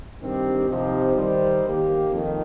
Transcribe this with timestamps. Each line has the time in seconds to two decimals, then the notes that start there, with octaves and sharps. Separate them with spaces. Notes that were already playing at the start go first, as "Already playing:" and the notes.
0.22 G2 D#3 C4 G4
0.68 C3 F3 D#4 G4 C5
1.16 D#3 G3 D#4 C5
1.63 D#3 A#3 G4
2.11 F2 D#3